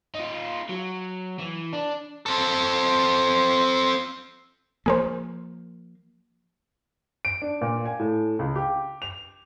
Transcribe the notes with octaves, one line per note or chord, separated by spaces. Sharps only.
D#4 F4
F#3
E3
D4
C4 A4
F3 A#3 G#4 A#4 C5
D7
D4
A#2
G#5
A2
C#2
G4
F7